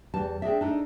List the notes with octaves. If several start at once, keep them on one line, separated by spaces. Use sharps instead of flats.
E2 G3 A5
C4 D4 G#4 D5 E5
D4 D#4 A4